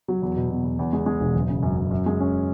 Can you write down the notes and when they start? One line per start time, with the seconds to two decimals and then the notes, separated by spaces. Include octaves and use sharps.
0.08 F#3
0.22 E2
0.36 B2
0.51 B2
0.64 E2
0.79 E2
0.93 G#3
1.06 G#3
1.21 E1
1.35 F#1
1.49 C#3
1.63 F#2
1.77 F#2
1.91 F#2
2.06 G#3
2.20 C#4